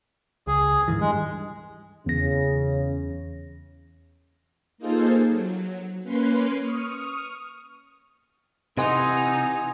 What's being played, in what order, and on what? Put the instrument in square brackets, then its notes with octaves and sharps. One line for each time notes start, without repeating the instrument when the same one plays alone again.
[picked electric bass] C#2 [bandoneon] G#4
[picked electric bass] G#2 D#3 E3
[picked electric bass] G2 [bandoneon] G#3
[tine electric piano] E2 A#6 [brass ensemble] C#3
[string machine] A#3 D#4 F4 G#4 A4 C5
F#3
A#3 C#4 B4 C6
C#6 D#6 F6
[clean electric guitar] C3 [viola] E3 D#4 [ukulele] D#5 [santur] F#5 G#5 C6